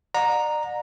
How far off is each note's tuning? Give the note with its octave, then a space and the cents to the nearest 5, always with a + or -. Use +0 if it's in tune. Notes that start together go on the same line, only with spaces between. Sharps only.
D5 +40 F#5 -35 A#5 +0